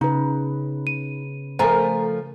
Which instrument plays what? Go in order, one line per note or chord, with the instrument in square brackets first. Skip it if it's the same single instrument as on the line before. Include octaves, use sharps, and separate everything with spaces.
[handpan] C#3 B4 [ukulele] D#4
[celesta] D#7
[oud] F3 A3 [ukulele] A#4 G#5 [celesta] C5 A#5